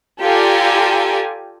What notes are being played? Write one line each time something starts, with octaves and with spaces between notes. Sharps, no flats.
F4 G4 A4 D5 G#5 A#5